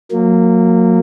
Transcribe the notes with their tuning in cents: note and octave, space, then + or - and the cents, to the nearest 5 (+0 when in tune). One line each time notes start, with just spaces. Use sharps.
F#3 -30 A#3 -20